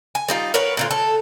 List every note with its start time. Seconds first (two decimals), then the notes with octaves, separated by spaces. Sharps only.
0.15 G#5
0.28 G3 D#4 F4
0.54 A#4 B4 C#5 F#5
0.77 A#2 D3 F4
0.91 A4